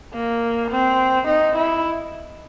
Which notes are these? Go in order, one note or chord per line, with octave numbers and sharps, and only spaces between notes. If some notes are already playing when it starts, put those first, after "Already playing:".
A#3
C4
D#4
E4